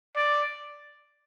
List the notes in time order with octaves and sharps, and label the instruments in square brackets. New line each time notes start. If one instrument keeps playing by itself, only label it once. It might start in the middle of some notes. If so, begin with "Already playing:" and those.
[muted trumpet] D5